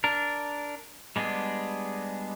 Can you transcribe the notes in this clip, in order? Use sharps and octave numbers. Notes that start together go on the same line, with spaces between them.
D4 A#4
G3 G#3 B3 D4 G#4